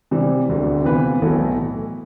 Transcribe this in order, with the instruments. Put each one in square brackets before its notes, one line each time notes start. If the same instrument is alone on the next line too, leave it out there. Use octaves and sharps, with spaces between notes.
[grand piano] C3 E3 G3
E1 D2 D3
C3 E3 B3 F4 B4
B1 A2 E3 A3